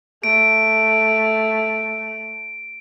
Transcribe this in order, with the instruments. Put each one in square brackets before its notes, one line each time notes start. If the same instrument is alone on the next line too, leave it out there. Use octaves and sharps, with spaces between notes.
[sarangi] A3 [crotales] D7